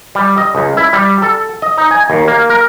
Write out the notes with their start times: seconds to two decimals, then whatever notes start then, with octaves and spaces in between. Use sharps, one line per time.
0.15 G3
0.37 D#5
0.55 C#2
0.77 E4
0.93 G3
1.22 A4
1.62 D#5
1.78 D#4
1.91 G#5
2.10 D#2
2.28 A#3
2.50 A#4